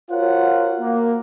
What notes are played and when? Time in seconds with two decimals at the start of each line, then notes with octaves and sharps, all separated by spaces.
0.11 F4 F#4 A#4 C5 C#5 F#5
0.80 A#3